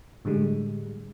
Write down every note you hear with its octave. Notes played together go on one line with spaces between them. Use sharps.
A2 D3 G3 G#3